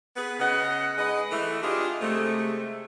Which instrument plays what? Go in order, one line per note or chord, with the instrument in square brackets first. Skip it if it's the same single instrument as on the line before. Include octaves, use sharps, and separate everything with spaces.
[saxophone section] B3 G#4 B4
C#3 D#5 F#5
G#3 B4 D#5
E3 A3
D4 F4 G4 G#4 D#5
C3 G#3 A3